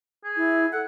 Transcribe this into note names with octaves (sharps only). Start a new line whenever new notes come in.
G#4
E4
A4 F#5